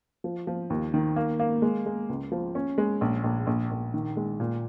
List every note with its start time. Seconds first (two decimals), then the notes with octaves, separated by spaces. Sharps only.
0.24 F3
0.47 F3
0.70 D#2
0.94 D#3
1.16 A#3
1.40 A#3
1.62 G#3
1.86 G#3
2.09 C#2
2.32 F3
2.55 C#4
2.78 G#3
3.01 A#1
3.24 A#1
3.47 A#1
3.71 A#1
3.94 D#3
4.17 G#3
4.40 A#2